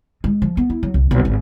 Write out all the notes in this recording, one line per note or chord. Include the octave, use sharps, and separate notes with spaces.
G#3
F3
B3
E4
F#3
C2
B1
G#1